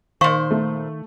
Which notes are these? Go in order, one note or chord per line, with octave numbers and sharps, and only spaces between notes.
A#2 D#3 C5 F5 C#6
A3